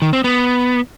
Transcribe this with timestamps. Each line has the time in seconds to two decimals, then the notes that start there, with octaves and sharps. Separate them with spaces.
0.02 D#3
0.13 C4
0.24 B3